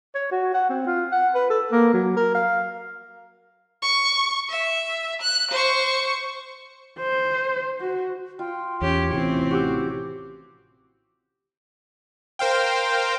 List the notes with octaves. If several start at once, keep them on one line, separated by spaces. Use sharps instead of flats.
C#5
F#4
F#5
C4
F4
F#5
B4
A4
A#3
F#3
A#4
F5
C#6
E5
F#6
C5 C#6
C5
F#4
F4 G5
E2 C#4 G4 C#5
A1 C3 E3 C4 C#4
F#4 G4 D6 E6
A#4 C5 F5 G5